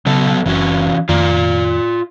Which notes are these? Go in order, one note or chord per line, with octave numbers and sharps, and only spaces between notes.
C#3 F#3 B3 A4
F#1 E3 C#4 F#4
F2 D#3 A3 F4 D5